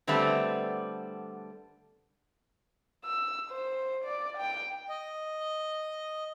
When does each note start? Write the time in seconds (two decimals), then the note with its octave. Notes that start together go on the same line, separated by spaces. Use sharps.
0.07 D3 G3 A3 B3 C4
3.05 E6
3.51 C5
4.04 D5
4.37 G5
4.89 D#5